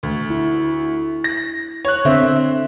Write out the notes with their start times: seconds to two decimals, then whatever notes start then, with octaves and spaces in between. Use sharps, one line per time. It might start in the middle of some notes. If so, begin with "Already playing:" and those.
0.03 D2
0.30 E4
1.24 A#6
1.85 C#5 F#6
2.05 D3 C4 E5